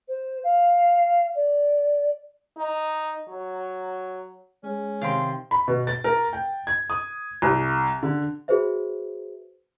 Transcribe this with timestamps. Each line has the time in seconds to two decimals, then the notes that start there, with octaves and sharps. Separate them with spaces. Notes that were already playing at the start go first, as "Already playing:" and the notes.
0.08 C5
0.43 F5
1.35 D5
2.58 D#4
3.28 F#3
4.63 G#3 C#4
5.01 C3 D#3 F5 G5 C6
5.51 B5
5.68 B2
5.87 A6
6.04 A#4
6.33 G5
6.67 G#6
6.90 D#6
7.42 C2
8.03 D3
8.48 F#4 G#4 B4 C5 E5